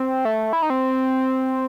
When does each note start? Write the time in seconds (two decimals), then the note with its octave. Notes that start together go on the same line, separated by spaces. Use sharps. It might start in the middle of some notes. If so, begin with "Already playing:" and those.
Already playing: C4
0.25 A3
0.53 E4
0.62 D#4
0.70 C4